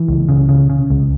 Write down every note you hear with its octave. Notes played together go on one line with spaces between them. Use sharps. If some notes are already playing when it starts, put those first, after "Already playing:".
Already playing: E3
C#2
C#3
C#3
C#3
C#2